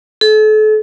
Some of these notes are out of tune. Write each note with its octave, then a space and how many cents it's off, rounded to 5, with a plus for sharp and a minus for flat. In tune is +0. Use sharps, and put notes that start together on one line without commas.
A4 -40